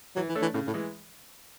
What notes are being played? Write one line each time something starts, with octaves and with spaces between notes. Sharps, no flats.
E3 F#3
E3
A3 D4 A4 C#5
E3
A2 C#3
A2
E3 G#3